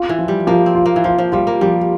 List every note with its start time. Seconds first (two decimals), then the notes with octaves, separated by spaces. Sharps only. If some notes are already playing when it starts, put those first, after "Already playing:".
Already playing: F4
0.09 E3
0.19 F3
0.28 G3
0.47 F3 A#3
0.66 C4
0.75 F4
0.86 A#3
0.96 E3
1.04 F3 F4
1.18 F3
1.32 G3 F4
1.47 A#3
1.61 F3 G3